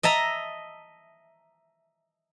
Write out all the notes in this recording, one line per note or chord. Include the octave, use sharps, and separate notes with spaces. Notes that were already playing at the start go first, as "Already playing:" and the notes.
D#5 E5 A5 A#5